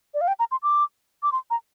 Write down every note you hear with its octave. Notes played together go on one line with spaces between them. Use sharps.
D5
F5
G5
A#5
C6
D6
D6
C6
A#5